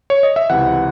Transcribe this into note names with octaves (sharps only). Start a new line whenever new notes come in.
C#5
D#5
E5
C#2 C3 E3 F#5